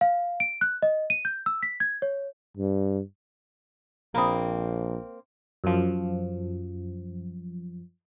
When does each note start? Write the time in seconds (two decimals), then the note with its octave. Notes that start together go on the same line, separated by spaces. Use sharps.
0.01 F5
0.40 D7
0.61 F#6
0.82 D#5
1.10 D#7
1.25 G6
1.46 E6
1.63 B6
1.80 G#6
2.02 C#5
2.57 G2
4.15 A#1 A#3 C4 A#5 B5 D#6
5.64 F#2 F3